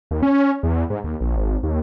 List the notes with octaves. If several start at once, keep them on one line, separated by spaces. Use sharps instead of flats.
D#2
C#4
E2
G#2
D#2
A#1
G#1
D#2